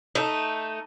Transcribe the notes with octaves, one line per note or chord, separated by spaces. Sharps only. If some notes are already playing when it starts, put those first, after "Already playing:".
A3 D#4